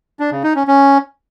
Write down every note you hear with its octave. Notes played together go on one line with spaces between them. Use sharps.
D4
C#3
D#4
C#4
C#4